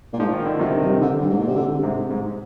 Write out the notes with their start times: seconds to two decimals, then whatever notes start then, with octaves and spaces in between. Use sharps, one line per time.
0.13 A#2
0.19 G#2 F3
0.33 D#3
0.45 D3
0.59 F2 C3 D#3
0.81 G2
1.01 D3
1.20 G2
1.29 G#2
1.39 A#2
1.47 C3
1.56 D3
1.83 G#2 C3
2.10 G#2